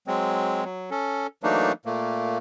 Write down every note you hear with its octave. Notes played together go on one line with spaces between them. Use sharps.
F#3 G#3 C4
F#3
C#4 A4
E3 F#3 A3 A#3 D4 D#4
A#2 A3 A#3